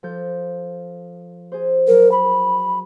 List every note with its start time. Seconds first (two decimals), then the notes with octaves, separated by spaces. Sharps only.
0.03 F3 A4 G6
1.52 G#4 C5
1.88 F#3 A#4
2.12 B5